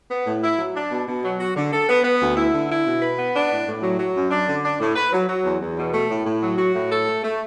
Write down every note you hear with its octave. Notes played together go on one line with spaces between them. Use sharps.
B3
A2
E4
F#3
D4
B2
B2
F#3
F#4
D3
A4
B3
B3
D2
E4
D3
E4
B2
B4
B3
D4
A2
A2
F#3
F#3
F#2
D4
D3
D4
A2
B4
F#3
F#3
E2
E2
B2
A3
A2
A2
F#3
F#4
A2
A4
A3
A3